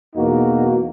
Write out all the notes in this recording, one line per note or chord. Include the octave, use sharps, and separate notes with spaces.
E2 B2 A#3 D#4 F#4